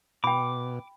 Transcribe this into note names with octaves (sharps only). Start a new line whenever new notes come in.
B2 G5 B5 D6